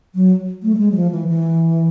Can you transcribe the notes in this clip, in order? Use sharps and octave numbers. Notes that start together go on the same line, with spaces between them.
F#3
A3
G3
G#3
F#3
F3
E3
E3